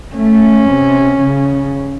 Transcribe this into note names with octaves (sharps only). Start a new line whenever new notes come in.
A3 C#4
C3
C#3